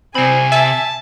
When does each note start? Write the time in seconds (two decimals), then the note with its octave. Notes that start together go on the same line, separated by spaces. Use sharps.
0.15 C3 C4 G#5 B5
0.52 E5 A5